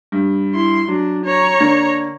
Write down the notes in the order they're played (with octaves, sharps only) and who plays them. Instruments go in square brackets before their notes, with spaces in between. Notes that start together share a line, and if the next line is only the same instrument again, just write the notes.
[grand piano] G2
[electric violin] E4 C6
[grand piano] F#3 [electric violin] D4
[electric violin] C#5 A#5
[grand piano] D3 A#3 D4